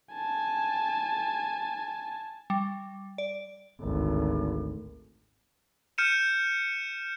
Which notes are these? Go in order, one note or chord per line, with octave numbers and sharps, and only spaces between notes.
G#5 A5
G3
D5
G#1 D2
F6 G6 C#7 D#7 E7